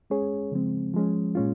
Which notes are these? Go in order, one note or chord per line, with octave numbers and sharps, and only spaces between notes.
G#3 C#4 G#4 C#5
C#3 F3 G#3 C4
F3 G#3 C#4
A#2 G#3 C#4 F4